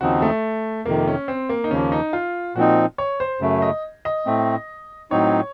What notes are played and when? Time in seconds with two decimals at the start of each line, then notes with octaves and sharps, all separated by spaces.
0.01 D#2 C#3 F3 C4 D#4 F#4
0.22 A3
0.85 F2 C3 D#3 A#3
1.07 C#4
1.28 C4
1.49 A#3
1.64 D#4
1.71 D#2 C#3 F3 A#3 C#4
1.92 D#4
2.13 F4
2.56 A#2 F3 C4 D#4 F#4
2.98 C#5
3.20 C5
3.40 F#2 C#3 A3
3.62 D#5
4.05 D#5
4.26 A2 A3 C4
5.11 A2 F#3 C4 D#4 C#5